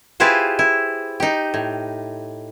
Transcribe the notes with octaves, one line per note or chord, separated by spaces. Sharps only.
E4 F4 G4 G#4 B4 C5
E4
D#4 G4
A2